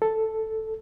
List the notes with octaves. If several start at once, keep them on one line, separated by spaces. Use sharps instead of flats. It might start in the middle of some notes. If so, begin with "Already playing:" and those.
A4